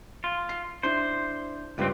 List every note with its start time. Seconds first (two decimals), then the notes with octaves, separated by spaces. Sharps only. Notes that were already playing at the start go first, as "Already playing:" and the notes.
0.24 F4
0.49 C7
0.83 D4 E4 C5
1.78 C#2 G2 C4 F4 G4 B4